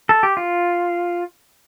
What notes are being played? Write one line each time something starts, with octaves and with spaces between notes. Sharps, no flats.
A4
G4
F4